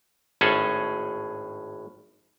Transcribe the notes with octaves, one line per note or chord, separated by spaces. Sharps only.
G#1 A2 C#4 G#4 A4